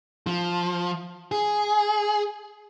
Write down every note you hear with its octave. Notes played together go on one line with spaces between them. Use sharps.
F3
G#4